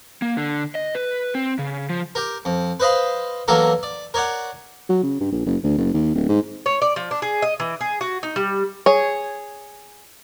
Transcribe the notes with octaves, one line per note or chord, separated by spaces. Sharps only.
A#3
D3
D#5
B4
C4
C#3
F3
G4 A#4
F2
B4 C5 D#5 F5 B5
E2 F#3 A#3 A4 A#4
D5
A#4 C#5 D5 F#5
F#3
C#3
G2
A#1
F#1
D2
F#1
D#2
D1
G#2
C#5
D5
F3
D4
G#4
D#5
E3
G#4
F#4
D#4
G3
G#4 C#5